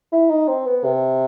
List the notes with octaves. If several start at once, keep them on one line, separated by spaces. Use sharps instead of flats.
E4
D#4
C4
B3
C3